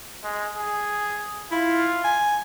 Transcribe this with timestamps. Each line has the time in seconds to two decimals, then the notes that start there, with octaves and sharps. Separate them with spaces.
0.23 G#3
0.56 G#4
1.51 E4 F4
2.04 G#5